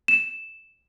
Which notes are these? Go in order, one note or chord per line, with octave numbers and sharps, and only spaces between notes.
E7